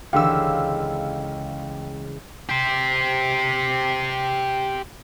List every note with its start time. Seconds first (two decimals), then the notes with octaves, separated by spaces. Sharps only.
0.13 C#2 D3 E3 G4 F5 G5 E6
2.49 G4 C5